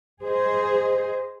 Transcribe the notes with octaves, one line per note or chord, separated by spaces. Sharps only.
G#4 C5 D#5